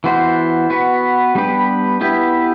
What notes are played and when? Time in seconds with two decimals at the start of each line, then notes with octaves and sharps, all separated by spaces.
0.04 E3 B3 F#4 C5
0.70 B3 F#4 B4
1.35 G3 B3 D4 G4 B4
2.01 B3 E4 G4 B4